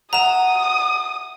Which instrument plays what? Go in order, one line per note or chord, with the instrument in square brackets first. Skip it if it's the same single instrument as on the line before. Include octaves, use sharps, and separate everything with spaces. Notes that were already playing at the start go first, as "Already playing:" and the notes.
[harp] E5 F#5 F6 [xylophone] A#5 E7 [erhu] D#6